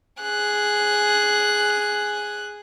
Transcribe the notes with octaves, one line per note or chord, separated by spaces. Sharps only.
G#4 F#6